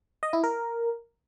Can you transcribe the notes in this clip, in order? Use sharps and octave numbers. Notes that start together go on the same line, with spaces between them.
D#5
E4
A#4